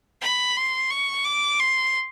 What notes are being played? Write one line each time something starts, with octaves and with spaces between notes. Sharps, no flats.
B5
C6
C#6
D6
C6